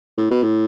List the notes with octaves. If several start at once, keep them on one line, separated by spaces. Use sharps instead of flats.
A2
B2
A2